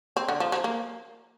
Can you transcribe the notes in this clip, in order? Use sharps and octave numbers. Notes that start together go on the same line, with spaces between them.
C4
D3
F3
F3
A#3